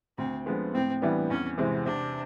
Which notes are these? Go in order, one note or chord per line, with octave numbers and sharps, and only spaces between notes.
D2 C4
D3 F3 G#3 B3
A2 C4
E3 G3 B3 D4
E2 C#4
C3 E3 G#3 C4
C3 D4